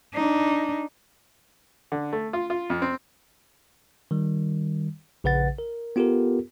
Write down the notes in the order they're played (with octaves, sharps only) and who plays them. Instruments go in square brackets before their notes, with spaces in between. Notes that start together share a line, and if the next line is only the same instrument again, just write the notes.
[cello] D4 D#4
[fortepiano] D3
A3
F4
F4
F2
C4
[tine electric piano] D#3 G3
A#1 C#3 B4 F#5 A6
A#4
B3 F4 G4 A4 A#4